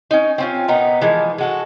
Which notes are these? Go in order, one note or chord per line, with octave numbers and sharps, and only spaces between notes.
C#4 D#4
C4 C#4 F4
A#2 B3 D#4 A#5
E3 F3 G#3 A#3
G#3 F#4 A4